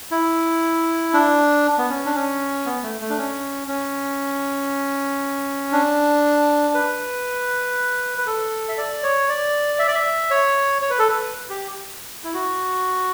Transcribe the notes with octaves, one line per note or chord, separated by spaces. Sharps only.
E4
D4
B3
C#4
D4
C#4
B3
A3
A3
D4
C#4
C#4
D4
B4
B4
A4
E5
D5
C#5
D5
E5
D5
E5
C#5
C#5
B4
A4
B4
G4
E4
F#4